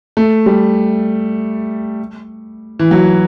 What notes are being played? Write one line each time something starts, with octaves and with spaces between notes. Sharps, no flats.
A3
G3
E3
F#3